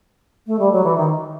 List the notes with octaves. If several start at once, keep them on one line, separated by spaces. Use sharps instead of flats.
A3
G3
F#3
E3
D#3